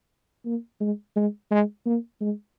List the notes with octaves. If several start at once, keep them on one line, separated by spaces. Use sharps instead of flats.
A#3
G#3
G#3
G#3
A#3
G#3